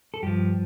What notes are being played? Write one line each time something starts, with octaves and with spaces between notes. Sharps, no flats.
A4
G2 F3 G4